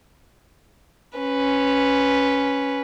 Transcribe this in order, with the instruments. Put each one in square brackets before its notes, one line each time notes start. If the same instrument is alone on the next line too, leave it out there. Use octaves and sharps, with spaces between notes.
[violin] C#4 B4